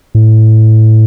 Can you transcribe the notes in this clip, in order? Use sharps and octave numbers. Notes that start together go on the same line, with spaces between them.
A2